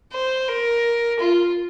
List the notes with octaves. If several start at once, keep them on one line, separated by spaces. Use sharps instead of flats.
C5
A#4
F4